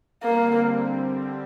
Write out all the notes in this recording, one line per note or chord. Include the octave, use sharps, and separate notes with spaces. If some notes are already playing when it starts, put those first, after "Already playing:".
D3 G3 A#3 C4